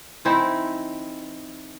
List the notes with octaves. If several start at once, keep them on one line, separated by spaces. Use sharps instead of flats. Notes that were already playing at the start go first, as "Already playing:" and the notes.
E3 C4 D#4 E4